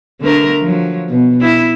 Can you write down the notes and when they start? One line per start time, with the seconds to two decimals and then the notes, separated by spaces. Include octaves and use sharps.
0.20 D3 A3 A#4
0.60 F3 F#3
1.08 B2
1.41 E4